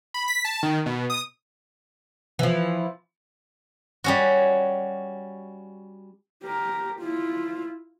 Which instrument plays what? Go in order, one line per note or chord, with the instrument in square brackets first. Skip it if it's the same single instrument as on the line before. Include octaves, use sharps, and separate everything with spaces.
[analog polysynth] B5
B6
A5
D#3
B2
D#6
[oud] E3 F3
[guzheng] G3 C#4 F#4
[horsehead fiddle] G4 A#4
E4 F4